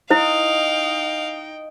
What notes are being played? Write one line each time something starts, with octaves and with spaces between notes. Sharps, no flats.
D#4 E4 C5 D#5 F5 G5